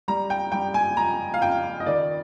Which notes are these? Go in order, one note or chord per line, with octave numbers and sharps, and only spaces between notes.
G3 A#5
G5
G3 G5
G#5
F2 A#5
F5
F2 G5
D#5
D#3 D5